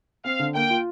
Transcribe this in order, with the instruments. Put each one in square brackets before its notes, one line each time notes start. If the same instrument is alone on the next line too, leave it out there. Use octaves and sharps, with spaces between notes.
[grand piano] C4 [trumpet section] F5
[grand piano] D3
[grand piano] A#3 [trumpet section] G5
[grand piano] F4